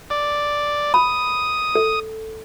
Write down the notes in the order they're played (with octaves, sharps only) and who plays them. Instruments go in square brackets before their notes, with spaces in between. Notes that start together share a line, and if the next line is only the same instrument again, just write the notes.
[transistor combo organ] D5
[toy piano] B5 [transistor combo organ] D#6
[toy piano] A4